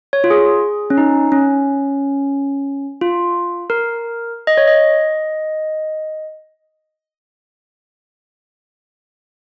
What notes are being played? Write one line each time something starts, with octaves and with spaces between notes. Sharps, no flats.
C#5
F4
G#4
C#4
D#4
C#4
F4
A#4
D#5
C#5
D#5